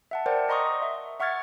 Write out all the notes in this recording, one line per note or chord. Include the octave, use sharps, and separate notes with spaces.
E5 F#5 A5
A#4 C5 D5 F#5 G5
D#5 A#5 C6 C#6 D#6
E5
E5 F#5 C#6 F6 G#6 A6